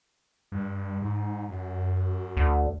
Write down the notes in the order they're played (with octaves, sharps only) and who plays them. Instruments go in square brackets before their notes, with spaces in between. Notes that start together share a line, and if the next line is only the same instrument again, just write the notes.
[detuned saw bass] G2
G#2
F#2
[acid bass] D2